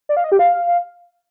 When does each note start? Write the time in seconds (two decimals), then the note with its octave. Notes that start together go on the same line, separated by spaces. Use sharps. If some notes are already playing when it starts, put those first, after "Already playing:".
0.09 D5
0.17 F5
0.24 D#5
0.32 G4
0.39 F5